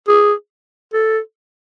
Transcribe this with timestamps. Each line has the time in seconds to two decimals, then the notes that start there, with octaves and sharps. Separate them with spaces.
0.08 G#4
0.93 A4